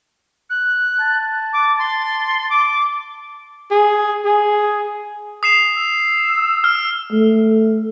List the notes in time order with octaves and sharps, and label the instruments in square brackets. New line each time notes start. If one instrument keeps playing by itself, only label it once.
[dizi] F#6
[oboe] A5
[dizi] D6
C6
D6
[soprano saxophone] G#4
G#4
[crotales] D#6 C7 E7
[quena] E6
[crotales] F6
[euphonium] A3